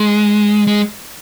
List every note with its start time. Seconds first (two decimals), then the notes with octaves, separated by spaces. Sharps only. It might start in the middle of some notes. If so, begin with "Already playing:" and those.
Already playing: G#3
0.67 G#3